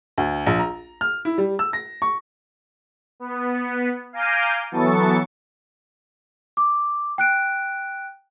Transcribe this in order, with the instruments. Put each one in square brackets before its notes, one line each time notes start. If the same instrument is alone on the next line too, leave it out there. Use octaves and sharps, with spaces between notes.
[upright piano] D2
A#1
A#5
F6
E4
G3
E6
A#6
C#6
[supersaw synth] B3
F5 G#5 A#5 D6 G6 D#7
E3 F#3 B3 A4 C#6 A6
[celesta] D6
G5 F#6 D7